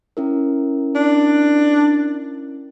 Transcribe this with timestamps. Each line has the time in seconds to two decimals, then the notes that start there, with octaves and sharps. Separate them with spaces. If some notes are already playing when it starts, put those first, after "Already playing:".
0.17 C#4 E4 A#4
0.95 D4